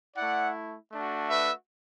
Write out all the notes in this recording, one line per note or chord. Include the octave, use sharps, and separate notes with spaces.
A3 E4 D5 F#5
A3 D4 F#4
B4 E5